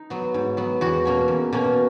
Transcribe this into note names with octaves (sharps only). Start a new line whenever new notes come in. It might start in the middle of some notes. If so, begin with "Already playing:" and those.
Already playing: D#4
F#3 B3
G#2
F#3 B3
E2 F#4
B2 A#3 C#4
E2
B2 A#3 C#4